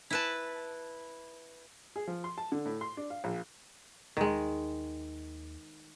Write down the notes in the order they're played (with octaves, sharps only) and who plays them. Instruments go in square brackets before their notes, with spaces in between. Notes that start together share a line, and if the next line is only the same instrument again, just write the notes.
[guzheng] E4 B4 A5
[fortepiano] G#4
F3
C6
A5
D3
A2
C6
D4
F5
A#1
[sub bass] D#2 [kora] D#3 G#3